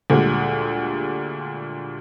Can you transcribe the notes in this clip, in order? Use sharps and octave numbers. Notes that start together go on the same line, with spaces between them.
D2 A#2 G3 G#3